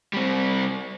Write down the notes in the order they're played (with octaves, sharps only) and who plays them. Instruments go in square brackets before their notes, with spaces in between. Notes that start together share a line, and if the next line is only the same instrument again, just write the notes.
[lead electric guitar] G3 C4